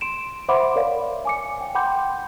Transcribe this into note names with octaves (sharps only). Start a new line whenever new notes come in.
C6 D7 E7
C5 E5 F#5 B5 C6 D6
A#4 C#5 D5 F5
G#5 D6 C#7
G5
F#5 G5 B5 C6 D6 G6